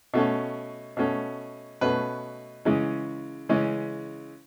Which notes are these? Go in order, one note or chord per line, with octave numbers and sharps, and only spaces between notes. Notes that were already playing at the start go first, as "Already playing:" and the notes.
B2 A3 C#4
B2 A3 C#4
B2 A3 C#4 B4
C#3 E3 G#3 C#4
C#3 E3 G#3 C#4